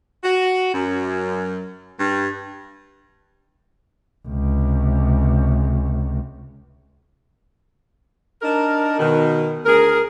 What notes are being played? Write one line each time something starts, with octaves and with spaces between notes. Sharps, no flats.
F#4
F#2
G2
C#2 C3
D4 D#4 A#4
B2 D#3
D2 G#4 A#4